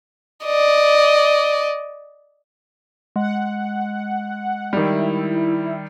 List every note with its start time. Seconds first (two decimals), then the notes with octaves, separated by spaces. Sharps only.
0.45 D5 D#5
3.16 G#3 F#5
4.73 D#3 G3 E4